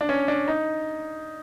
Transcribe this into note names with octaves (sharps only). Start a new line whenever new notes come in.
D4
C#4
D4
D#4